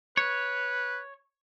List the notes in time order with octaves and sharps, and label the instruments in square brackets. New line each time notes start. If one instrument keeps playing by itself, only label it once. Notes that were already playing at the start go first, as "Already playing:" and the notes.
[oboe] B4 [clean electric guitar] C#5